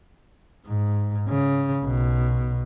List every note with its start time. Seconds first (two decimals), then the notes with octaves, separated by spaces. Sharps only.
0.67 G#2
1.28 C#3
1.84 B1 B2